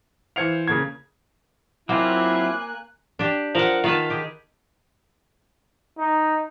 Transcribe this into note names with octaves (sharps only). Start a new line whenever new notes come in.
E3 C5 F5 G#6 C#7 F7
C#3 A#3 G#6
F#3 A#3 C4 E4 F4 G#5 F#6
D4 G4
F3 A#4 F#5
D#3 F4 B4 A5
G4 G#4
D#4